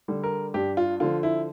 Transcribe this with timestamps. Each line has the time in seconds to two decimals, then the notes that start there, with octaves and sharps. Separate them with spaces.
0.08 D3 G3
0.24 A#4
0.54 G2 G4
0.77 F4
1.00 D3 F3 F4
1.23 E4